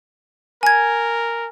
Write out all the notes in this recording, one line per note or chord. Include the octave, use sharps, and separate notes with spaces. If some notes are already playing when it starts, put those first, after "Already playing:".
A#4 G#5 G#6